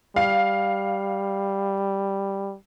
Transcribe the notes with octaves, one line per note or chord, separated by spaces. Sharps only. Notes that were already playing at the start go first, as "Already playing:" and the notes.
G3 F5